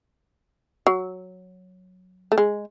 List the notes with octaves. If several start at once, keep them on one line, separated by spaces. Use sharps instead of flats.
F#3
A3
G#3